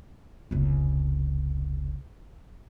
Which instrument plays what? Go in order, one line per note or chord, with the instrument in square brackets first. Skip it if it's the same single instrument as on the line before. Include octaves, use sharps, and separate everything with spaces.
[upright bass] F1 C#2